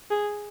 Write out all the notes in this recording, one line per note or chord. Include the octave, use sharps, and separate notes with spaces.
G#4